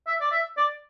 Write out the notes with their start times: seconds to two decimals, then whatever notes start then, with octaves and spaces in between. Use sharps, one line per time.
0.07 E5
0.21 D5
0.32 E5
0.57 D5